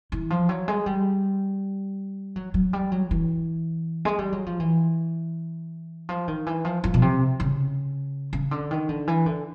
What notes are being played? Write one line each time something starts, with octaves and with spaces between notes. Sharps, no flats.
E3
F3
F#3
G#3
G3
F#3
F#3
G3
F#3
E3
G#3
G3
F#3
F3
E3
F3
D#3
E3
F3
F3
B2
C3
C#3
C#3
D3
D#3
D3
E3
D3